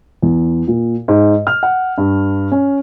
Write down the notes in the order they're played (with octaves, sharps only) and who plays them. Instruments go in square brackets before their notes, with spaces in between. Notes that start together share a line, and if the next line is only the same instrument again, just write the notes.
[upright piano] E2
A#2
G#2
F6
F#5
G2
C#4